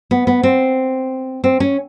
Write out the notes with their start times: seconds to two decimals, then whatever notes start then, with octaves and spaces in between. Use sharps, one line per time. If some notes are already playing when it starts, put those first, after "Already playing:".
0.11 B3
0.27 B3
0.43 C4
1.44 C4
1.60 C#4